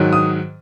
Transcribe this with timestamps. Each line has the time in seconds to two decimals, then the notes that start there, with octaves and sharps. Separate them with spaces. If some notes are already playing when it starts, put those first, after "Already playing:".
Already playing: G#2 D#3 F#3
0.13 D#6